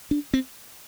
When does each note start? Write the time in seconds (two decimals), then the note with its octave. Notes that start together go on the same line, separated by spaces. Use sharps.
0.11 D4
0.34 C4